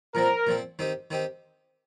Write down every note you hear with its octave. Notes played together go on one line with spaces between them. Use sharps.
A#2 F3 C4 A#4
A#2 F3 C4
D#3 C4 D#4 G4
D#3 C4 D#4 G4